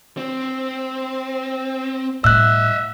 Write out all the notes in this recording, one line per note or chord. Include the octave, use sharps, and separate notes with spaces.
C4
A2 G3 D#5 E5 E6 F#6